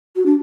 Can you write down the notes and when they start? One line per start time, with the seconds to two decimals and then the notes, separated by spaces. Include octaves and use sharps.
0.16 F#4
0.26 D4